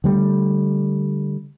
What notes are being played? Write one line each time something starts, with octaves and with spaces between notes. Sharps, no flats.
D3 G3 A3